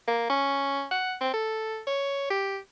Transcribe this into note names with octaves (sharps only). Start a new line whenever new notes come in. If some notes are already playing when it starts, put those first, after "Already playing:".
A#3
C#4
F#5
C4
A4
C#5
G4